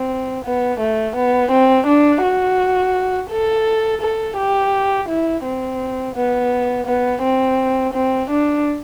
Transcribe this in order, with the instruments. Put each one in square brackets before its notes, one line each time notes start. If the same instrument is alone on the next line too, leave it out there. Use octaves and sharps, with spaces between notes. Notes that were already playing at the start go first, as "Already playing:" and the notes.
Already playing: [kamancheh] C4
B3
A3
B3
C4
D4
F#4
A4
A4
G4
E4
C4
B3
B3
C4
C4
D4